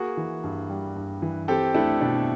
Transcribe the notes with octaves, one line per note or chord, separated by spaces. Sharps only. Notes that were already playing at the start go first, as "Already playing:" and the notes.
Already playing: A#3 F#4 G#4
E3
G2
G3
G2
E3
C4 G4 A4
A3 D4 E4
B2 D4